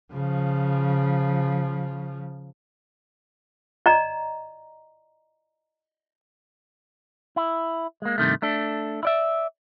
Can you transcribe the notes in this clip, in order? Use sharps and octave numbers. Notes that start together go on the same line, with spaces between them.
C#3 F3
D5 D#5 A#5
E4
G#3 A#3
G2 C3 D#3 A3
A3 D4 A4
E4 D5 E5